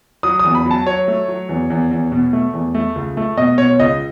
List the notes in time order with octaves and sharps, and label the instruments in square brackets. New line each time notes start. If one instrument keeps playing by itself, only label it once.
[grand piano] F#3 D#6
E2 D#6
B5
F#3
A5
F#3 C#5
A3
F#3
E2
E2
E2
B2
A3
E2
A3
C#2
A3
B2 D#5
B2 C#5
C#2 D#5